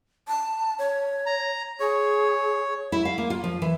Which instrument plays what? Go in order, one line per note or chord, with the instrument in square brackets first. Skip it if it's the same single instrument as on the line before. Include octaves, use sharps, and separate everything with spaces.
[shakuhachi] A5
C#5
[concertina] A#5
[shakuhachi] G#4 [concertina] C#5
[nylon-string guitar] E4
F5
A#3
F4
F3
E3